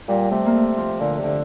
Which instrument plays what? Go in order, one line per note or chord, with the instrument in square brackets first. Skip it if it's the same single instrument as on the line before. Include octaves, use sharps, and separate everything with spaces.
[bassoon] A#2 [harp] G3
[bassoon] C3 [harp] A3
[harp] A#3
A3
F3
[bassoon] A#2 [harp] D3
[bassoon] C3
[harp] D3